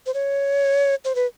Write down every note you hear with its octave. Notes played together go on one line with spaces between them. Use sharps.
C5
C#5
C5
B4